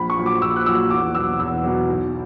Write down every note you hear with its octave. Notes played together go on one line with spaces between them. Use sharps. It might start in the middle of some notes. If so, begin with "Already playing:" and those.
Already playing: A#1 B5
C#6
A#2 F#3
D6
A#1 E6
F#6
A#2 F#3 E6
E2 D6
B2 F#3 E6
E2 E6
B2 F#3
B1